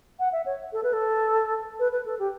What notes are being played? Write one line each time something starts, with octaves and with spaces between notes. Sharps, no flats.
F#5
E5
C#5
A4
B4
A4
B4
B4
A4
G4